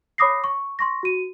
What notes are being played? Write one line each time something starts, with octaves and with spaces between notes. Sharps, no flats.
C#5 B5 D6 D#6 A#6 C7
C#6
C6 C#6 A#6
F#4 D#7